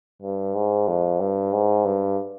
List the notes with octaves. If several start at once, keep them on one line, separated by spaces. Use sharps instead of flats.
G2
G#2
F2
G2
G#2
G2